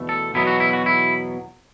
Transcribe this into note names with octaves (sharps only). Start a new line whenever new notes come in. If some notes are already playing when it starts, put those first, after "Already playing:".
Already playing: E2 B2 A3
A4
E2 B2 F#3 B3 E4
F#4
E4
F#4
E4